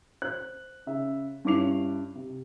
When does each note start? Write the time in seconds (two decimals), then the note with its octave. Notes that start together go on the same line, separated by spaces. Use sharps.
0.22 C5 F#6
0.87 C#3 E5
1.45 G2 C#4 E4 D6 C7 F7
2.15 C3